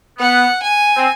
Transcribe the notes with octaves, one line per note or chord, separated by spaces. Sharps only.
B3 F#5
G#5
C4